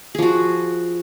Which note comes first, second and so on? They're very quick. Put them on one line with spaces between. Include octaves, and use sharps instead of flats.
G#4 F3 F#4